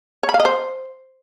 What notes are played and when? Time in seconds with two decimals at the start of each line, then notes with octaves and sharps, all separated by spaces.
0.23 C#5
0.29 B5
0.34 F5
0.40 D#5
0.45 C5